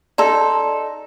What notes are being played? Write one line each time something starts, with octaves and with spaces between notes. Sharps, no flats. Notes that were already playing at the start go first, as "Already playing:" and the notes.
D#4 A4 D5 C6